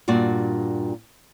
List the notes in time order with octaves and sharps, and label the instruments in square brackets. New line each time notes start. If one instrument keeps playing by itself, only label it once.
[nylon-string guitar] G2 A#2 F#4 D5